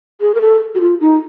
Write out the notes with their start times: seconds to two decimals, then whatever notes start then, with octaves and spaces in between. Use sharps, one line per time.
0.21 G#4
0.35 A#4
0.41 A4
0.75 F#4
0.80 F4
1.01 D#4